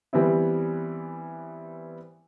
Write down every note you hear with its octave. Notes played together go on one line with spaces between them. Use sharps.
E3 G3 B3 C4 E4